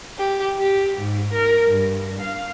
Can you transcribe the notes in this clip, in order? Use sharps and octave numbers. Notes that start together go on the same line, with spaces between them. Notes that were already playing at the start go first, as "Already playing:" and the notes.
G4
G4
G#2
A#4
G2
F5